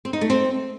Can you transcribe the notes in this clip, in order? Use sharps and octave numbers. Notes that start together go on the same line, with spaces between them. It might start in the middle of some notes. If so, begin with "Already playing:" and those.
C4
D#4
A3
C4